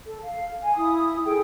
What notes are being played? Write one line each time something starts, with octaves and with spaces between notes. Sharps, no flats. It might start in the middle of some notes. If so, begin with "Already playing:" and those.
A4
F5
G#5
E4 D#6
G#4 A4 G5